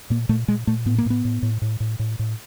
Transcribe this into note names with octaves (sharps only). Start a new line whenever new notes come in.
A#2 A#3
A#2 A3
A#2 G#3
A#2 A3
A2 B3
A#3
A2 B3
A2
A2
A2
A2
A2
A2